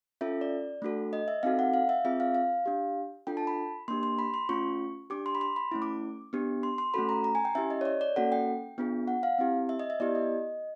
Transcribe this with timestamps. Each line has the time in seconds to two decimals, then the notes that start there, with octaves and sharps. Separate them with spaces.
0.21 C#4 F4 A4 E5
0.41 D5
0.82 A3 D4 F#4 A4
1.13 D#5
1.28 E5
1.43 C4 D#4 F#4 A4 F5
1.59 F#5
1.74 F5
1.89 E5
2.05 C4 F4 G#4 E5
2.20 F5
2.35 F5
2.66 D4 G4
3.27 D4 F4 A4 G5
3.37 A5
3.47 B5
3.88 A#3 D4 G4 C6
4.03 C6
4.19 B5
4.34 C6
4.49 A3 C#4 F4 C#6
5.10 D4 G4 D6
5.26 C6
5.35 B5
5.41 C6
5.56 B5
5.72 A3 C#4 E4
5.82 D6
6.33 B3 D4 G4
6.63 C6
6.78 C6
6.94 A3 C#4 F#4 A4 B5
7.09 A#5
7.24 A#5
7.35 G#5
7.45 G5
7.55 C#4 E4 G4 E5
7.70 D#5
7.81 C#5
7.85 D5
8.01 D5
8.16 A#3 C#4 F#4 A4 F#5
8.32 G5
8.78 B3 D4 F4 G#4
9.08 F#5
9.23 F5
9.39 C4 E4 G4
9.69 E5
9.79 D#5
9.90 E5
10.00 B3 E4 G4 D5
10.15 D#5